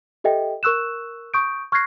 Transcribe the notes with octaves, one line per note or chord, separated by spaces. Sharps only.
G4 A4 D#5 E5 G5
A#4 C#6 E6 F#6 E7
C#6 D#6 G6 D7
C#6 F6 F#6 G#6 A#6 C7